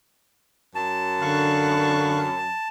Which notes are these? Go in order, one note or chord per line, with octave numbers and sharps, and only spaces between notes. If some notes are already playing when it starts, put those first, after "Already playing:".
F#2 A5
D3 F5 C#6 F#6